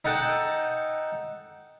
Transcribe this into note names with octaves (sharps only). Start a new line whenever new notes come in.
D#4 A4 F#5 G5 A5